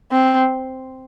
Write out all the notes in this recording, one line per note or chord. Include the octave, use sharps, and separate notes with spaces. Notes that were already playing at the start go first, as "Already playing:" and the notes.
C4